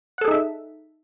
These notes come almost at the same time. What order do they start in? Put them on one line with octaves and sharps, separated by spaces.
F#5 A4 G#4 D#4 E5